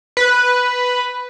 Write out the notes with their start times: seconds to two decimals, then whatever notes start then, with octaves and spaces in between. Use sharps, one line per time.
0.17 B4